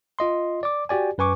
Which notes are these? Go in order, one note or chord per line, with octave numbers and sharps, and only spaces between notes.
F4 D#5 C6
D5 D6
F#4 G4 D5 G#5
F#2 B4 G#5 C#6 D6